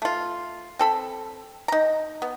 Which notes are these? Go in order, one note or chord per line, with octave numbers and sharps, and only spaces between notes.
A3 F4
C4 A4 B5
D#4 A#5
B3